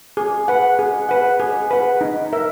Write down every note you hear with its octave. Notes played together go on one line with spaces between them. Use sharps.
G#4
B4 F#5
G#4
B4 F#5
G#4
B4 F#5
D#4
A#4 E5